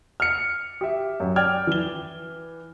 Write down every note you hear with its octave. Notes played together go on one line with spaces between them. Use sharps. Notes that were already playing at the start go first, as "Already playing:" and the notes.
F6 C#7
G4 E5
F#2
D5 G5 F6 G#6
E3 G7